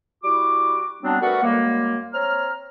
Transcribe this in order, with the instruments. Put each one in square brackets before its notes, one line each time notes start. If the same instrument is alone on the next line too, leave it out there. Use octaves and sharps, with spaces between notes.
[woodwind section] G3 E4 F#4 D6
F#3 G3 B3 C4 D4
A3 F#4 A#4 B4 D5 F#5
F#2 G3 G#3 A#3
C4 C#5 A#5 F6